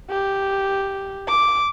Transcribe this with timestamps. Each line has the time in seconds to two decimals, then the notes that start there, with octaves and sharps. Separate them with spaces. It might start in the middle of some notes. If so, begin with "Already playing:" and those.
0.10 G4
1.28 D6